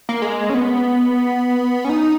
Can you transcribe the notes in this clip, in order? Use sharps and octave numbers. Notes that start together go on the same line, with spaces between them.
A#3
G#3
C#4
B3
C#4
D#4